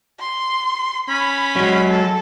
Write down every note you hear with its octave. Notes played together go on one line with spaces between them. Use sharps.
C6
C#4 B5
F#3 G#3
A4